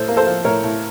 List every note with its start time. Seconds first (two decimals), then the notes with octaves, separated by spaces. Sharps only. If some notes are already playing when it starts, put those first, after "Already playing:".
Already playing: A2 A4 C5
0.08 A#3
0.17 A4 C5
0.27 F3
0.44 A2 A#4 C#5
0.63 A2